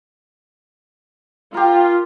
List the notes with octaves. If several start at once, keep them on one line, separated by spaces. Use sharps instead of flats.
F4 G4 A#4